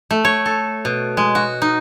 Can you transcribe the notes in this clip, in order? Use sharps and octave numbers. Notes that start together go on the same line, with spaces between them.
A3
C#5
A4
B2
G#3
F#4
D#4